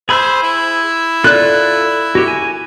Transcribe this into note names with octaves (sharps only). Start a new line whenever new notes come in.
G#4 C5 B5 E6
E4
F4 A4 D5 F#6
F#4 G4
G#5